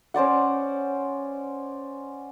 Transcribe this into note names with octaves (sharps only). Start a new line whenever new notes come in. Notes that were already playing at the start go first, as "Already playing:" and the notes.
C#4 C5 D5 F#5